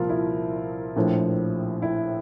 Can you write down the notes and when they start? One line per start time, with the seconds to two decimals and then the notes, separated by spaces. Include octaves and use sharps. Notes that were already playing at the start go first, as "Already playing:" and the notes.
Already playing: C2 A#2 F3 F4 A#4
0.09 E4
0.96 A#1 A2 F3
1.82 E4